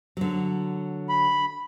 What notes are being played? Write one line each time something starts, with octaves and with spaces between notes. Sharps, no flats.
D3 F#3
B5